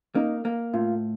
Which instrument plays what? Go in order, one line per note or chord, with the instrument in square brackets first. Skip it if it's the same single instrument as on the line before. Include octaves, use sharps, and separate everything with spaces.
[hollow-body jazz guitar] A#3 [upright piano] D#4
[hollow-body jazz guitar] A#3
[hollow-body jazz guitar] A2 [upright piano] F4